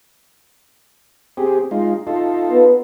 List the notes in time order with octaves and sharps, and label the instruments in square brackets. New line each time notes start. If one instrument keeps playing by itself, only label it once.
[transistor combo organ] C4 G4 G#4
G#3 D#4 F4
D#4 F4 A4
[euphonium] B3